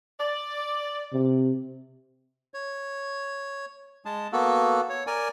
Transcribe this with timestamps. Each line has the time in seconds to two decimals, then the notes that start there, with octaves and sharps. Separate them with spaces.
0.20 D5
1.13 C3
2.54 C#5
4.05 G#3 A5
4.32 A#3 B3 F#4 A4
4.90 C#5
5.07 A#4 D5 G#5